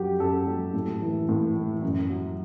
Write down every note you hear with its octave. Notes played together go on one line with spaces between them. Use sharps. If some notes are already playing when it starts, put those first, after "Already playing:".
Already playing: F#2 F#3 F#4 G4
F#2 A4
F#3
A2
E3
A2
E3
F#2
F#3